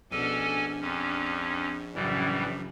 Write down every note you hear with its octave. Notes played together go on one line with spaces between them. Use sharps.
A#1 B2 C#4 D4 A4 G#5
F2 C#4 D4
F#2 A2 C#3 E3 G3